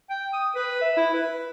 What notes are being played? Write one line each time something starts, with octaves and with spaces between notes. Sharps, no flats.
G5
D#6
B4
E5
E4
B4